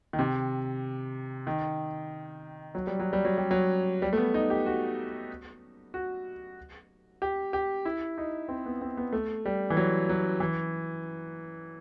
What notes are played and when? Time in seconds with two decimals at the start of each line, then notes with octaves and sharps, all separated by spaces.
0.13 D#3
0.19 C3
1.47 D#3
2.75 F#3
2.87 G3
2.99 F#3
3.13 G3
3.25 F#3
3.38 G3
3.51 F#3
4.02 G3
4.13 A3
4.17 B3
4.34 D#4
4.50 G4
4.66 F#4
5.94 F#4
7.22 G4
7.53 G4
7.85 E4
8.18 D#4
8.48 C4
8.66 B3
8.81 C4
8.97 B3
9.13 A3
9.45 G3
9.70 E3
9.77 F#3
10.09 F#3
10.40 E3